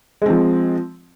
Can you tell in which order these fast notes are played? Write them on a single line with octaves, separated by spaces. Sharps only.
G#3 C4 F3